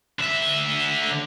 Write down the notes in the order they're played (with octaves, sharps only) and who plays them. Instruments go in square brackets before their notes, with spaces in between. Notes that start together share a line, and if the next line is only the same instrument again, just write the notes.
[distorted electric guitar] D3 E5